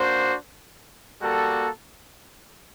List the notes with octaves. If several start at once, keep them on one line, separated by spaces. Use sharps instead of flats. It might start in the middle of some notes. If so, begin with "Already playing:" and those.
Already playing: A#3 D4 F#4 C5
G3 A#3 F#4 A4